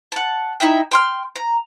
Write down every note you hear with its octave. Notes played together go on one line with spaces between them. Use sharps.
F#5 A5
D#4 E4 E5 G5
G5 C6 F6
A#5